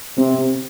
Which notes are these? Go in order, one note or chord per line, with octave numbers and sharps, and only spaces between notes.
C3 C4
C4